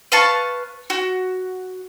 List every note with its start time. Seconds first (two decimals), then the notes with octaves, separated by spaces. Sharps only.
0.12 B4 F5 A5 C#6
0.90 F#4